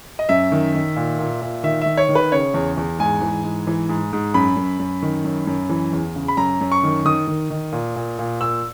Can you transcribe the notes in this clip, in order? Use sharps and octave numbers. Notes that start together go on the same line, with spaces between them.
D#5
F#2 E5
D#3
D#3
A#2
A#2
A#2
D#3 E5
D#3 E5
C#5
D#3
B4
C#3 C#5
E2
E2
G#2 G#5
E3
G#2
E3
G#2
G#2
F#2 B5
F#2
F#2
D#3
F#2
F#2
E3
E2
C#3
B5
F#2 A#5
F#2
C#6
D#3
D#3 D#6
D#3
D#3
A#2
A#2
A#2
A#2 E6